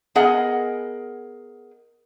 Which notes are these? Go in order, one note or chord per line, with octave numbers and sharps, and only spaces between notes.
B3 G#4 A#4 D#5 F#5 G#5